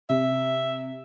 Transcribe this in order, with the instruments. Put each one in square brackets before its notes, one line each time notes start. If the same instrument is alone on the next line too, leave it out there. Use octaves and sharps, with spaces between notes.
[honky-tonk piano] C3 [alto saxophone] E5